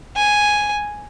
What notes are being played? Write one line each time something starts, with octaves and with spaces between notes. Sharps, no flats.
G#5